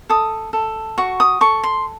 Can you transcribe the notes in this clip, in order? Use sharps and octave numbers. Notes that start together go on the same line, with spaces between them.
A4 D#6
A4
F#4 C#6
D#6
A4 C#6
C6